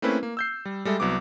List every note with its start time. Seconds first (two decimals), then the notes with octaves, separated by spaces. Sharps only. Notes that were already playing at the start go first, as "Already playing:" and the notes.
0.02 A3 A#3 C4 C#4 E4 B4
0.23 A#3
0.37 E6 G6 C7
0.65 G3
0.85 G3 G#3 A4 E5
1.00 C2 F#3 B3 D6